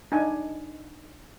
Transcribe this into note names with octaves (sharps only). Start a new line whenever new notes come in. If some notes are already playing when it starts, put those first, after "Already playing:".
D4 D#4 G#5